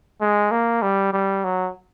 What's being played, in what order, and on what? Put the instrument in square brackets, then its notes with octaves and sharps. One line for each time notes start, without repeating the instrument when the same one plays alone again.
[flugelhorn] G#3
A#3
G3
G3
F#3